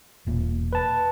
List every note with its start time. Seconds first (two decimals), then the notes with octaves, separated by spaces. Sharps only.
0.27 E1 A#2
0.73 B4 A5